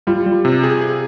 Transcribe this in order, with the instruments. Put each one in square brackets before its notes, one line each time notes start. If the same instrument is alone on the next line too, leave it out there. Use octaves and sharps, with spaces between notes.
[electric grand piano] G3 [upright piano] F4
[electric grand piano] G3
C3
G#4
G#4